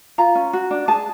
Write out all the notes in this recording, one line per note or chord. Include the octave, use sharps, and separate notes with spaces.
F4 A#5
C#4
F#4
D4
G#4 A5